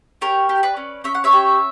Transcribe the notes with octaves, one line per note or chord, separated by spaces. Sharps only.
G4 A#4 C#5
G4
B4 D5
C#4
C#4 E5
F#5
C#5 E5
G4